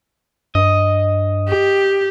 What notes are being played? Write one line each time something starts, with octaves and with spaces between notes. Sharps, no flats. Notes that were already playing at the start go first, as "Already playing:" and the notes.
G2 D#5
G4